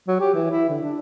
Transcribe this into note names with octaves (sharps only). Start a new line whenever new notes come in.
F#3
G4
E3
E4
D3
D4